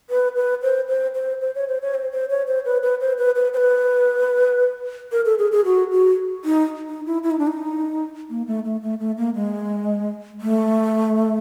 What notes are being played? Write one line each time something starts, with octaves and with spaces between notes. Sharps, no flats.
B4
B4
C5
C5
C5
C5
C#5
C5
C#5
C5
C5
C#5
C5
B4
B4
C5
B4
B4
C5
B4
A#4
A4
G#4
G#4
F#4
F#4
D#4
D#4
E4
E4
D#4
D4
D#4
A#3
A3
A3
A3
A3
A#3
G#3
A3